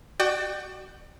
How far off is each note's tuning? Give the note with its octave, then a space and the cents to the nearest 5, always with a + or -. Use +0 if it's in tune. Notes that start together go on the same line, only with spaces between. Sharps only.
F#4 +20 D5 +35 G5 +0